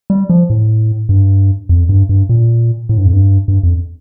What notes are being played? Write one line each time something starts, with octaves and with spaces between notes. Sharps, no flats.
G3
F3
A2
G2
F2
G2
G2
A#2
A2
G2
F2
G2
G2
F2